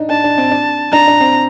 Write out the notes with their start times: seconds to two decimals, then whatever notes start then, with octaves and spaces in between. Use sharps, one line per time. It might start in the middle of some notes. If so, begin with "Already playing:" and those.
Already playing: D4 D#4
0.10 D4 A5
0.24 D4
0.38 C4
0.51 D4
0.92 D4 A#5
1.07 D4
1.20 C4